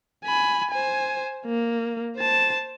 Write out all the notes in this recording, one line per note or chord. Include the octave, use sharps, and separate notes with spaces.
G#5 B5
C5 G#5
A#3
C5 A5